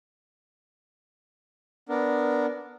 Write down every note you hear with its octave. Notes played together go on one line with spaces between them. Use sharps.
B3 D4 A#4